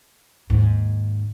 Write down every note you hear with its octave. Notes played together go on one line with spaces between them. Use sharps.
D#2 G#2